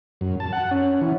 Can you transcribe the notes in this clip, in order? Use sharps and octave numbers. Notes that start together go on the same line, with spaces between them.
F#2
A5
F#5
C#4
E3